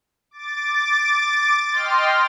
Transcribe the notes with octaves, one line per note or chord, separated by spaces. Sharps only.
D6 A6
D#5 G5 C6 F6